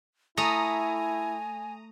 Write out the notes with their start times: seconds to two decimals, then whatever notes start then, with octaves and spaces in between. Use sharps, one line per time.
0.37 A3 E4 G#5 A#5 D#6